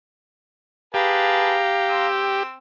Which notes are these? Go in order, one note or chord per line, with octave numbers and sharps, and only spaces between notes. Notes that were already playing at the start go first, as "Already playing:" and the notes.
G4 G#4 B4 F5 A5 A#5
C4 E6